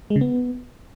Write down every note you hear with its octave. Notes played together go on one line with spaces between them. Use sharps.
G#3
C#3
B3